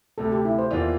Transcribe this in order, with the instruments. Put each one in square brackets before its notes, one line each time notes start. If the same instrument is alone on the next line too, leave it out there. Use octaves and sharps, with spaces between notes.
[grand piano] D2 C3 G3 [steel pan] A4
[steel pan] G4
E4
C5
[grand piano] E2 E3 A#3 F4 [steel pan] D5